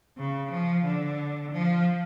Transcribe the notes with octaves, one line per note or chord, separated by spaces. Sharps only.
C#3
F3
D3
F3